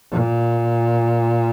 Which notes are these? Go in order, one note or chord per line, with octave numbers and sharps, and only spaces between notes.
A#2